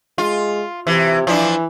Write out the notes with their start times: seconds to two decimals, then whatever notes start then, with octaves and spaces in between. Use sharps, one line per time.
0.18 G#3 F4
0.87 C3 E3
1.27 E3 F3 D4